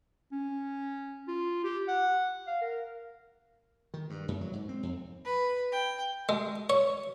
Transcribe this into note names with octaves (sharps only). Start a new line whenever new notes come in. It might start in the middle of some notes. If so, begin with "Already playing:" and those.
C#4
F4
G4
F#5
F5
A#4
D#3
G2
F#2
F#3
G#2
C4
F2
B4
G5
G#3
C#5